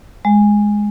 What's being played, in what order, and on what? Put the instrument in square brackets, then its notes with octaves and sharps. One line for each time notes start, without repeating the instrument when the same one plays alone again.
[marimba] G#3